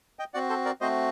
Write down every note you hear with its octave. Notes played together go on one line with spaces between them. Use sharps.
D#5 G5
C4 F#4 D5 F#5
A4 C5
A#4 D5
A3 C4 F#4 C5 D#5